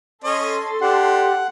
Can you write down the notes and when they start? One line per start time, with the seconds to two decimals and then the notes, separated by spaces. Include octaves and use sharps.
0.24 C#4 A4 C#5 D#5 C6
0.82 D4 G4 F#5